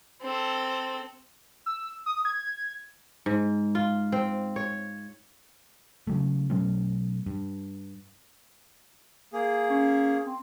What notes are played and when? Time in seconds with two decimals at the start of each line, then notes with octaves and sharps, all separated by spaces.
0.21 C4 A4
1.66 E6
2.06 D#6
2.25 G#6
3.26 G#2
3.75 F4
4.12 C4
4.56 C#5
6.07 C#3 F#3 A3
6.50 B2 F#3 A3 C#4
7.26 G2
9.33 A#3 G#4
9.70 C#4
10.26 C4